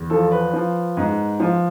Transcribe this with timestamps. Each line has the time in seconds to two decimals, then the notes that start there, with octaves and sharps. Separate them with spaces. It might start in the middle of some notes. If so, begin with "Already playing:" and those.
Already playing: E2
0.10 F3 A4
0.32 B4
0.53 F3
0.97 G#2
1.40 F3